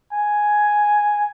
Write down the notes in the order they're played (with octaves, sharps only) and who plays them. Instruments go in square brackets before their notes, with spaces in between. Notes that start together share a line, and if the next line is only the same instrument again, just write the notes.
[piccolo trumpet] G#5